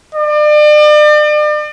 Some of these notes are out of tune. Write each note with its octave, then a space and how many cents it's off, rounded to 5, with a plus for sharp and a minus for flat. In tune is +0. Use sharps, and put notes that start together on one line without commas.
D5 +40